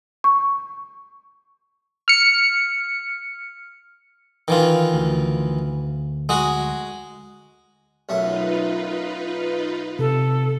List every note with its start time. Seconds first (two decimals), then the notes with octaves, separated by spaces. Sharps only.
0.24 C#6
2.08 F6 C#7
4.48 D#3 E3 F4
4.93 D2
6.29 G#3 F#4
8.09 B1 F#2 A3 D#4 F4 B4
9.99 C3 A4